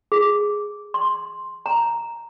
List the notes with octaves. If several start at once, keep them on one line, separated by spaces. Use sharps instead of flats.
G#4
C6
A#5